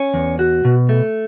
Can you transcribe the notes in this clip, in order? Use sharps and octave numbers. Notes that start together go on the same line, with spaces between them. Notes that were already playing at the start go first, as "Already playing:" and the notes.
Already playing: C#4
E2
F#4
B2
A3